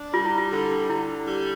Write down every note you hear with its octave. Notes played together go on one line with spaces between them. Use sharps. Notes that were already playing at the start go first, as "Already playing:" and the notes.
Already playing: D4
G3 F4
E4
F4
D3
D3 E4
G3